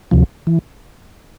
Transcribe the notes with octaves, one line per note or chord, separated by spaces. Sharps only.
D2 C3 F3
E3